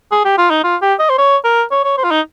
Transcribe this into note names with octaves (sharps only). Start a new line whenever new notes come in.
G#4
G4
F4
D#4
F4
G4
D#5
C5
C#5
A#4
C#5
C#5
C5
F4
D#4